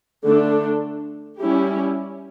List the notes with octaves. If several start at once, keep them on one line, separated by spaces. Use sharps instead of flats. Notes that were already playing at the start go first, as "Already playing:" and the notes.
D3 A3 D4 A4
G3 C#4 E4 G4